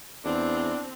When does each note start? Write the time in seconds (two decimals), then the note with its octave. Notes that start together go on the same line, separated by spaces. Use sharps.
0.25 E2 C4 D4